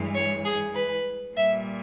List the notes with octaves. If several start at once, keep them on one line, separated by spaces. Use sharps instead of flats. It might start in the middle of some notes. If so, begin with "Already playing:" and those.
Already playing: G2 E3 G#3
C#5
G#4
B4
A#2 G3 E5